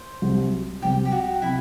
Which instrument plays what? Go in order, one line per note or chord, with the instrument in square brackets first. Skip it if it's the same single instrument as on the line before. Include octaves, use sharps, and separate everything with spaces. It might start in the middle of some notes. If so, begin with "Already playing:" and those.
Already playing: [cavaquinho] C5
[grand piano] C2 C3 F#3 C4
[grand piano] C2 C3 F#3 C4 [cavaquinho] G4
[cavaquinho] G4
F#4
[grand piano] C3 F#3 C4 [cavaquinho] E4